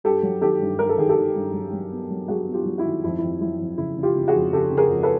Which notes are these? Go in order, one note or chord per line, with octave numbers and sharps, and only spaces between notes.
G2 G4 A4
F#3
D#3 G4 A4
G2
G2 A#4
A4
D#3 G#4
G4 A4
D#3
G2
F#3
F#3
B3
F#3
F#3 F#4 G#4
B3
F4 G4
F#3
E4 F#4
D#3
F2 E4
F2 E4
F#3 E4
F2
C#3 E4
C#3
F4 G4
C#3
F#4 G#4
F2
C#3 G4 A4
C#3
G#4 A#4
F2
A4 B4